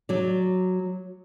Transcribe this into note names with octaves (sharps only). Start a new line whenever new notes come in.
F#3 D5